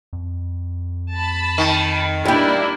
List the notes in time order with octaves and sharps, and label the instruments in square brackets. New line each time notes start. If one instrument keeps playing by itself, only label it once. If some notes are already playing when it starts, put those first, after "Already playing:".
[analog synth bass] F2
[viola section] A5 B5
[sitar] D#3
[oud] G3 G4 [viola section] A#3 D4 E4